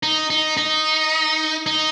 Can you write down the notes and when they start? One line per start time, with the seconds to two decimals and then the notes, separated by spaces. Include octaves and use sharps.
0.03 D#4
0.30 D#4
0.58 D#4
1.66 D#4